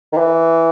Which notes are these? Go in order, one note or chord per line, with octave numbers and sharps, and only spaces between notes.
D#3
E3